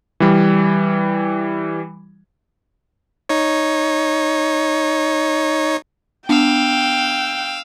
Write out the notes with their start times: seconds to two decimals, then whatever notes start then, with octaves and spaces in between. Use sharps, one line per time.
0.20 E3 G3
3.29 D#4 C#5
6.29 B3 D4 F5 G5 E6